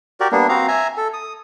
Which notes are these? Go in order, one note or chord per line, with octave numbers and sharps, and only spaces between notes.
F#4 G4 A#4 D5
G3 A#3 B3 D4
C4 F#4 F5 A#5
E5 G#5 A#5
A4
D#6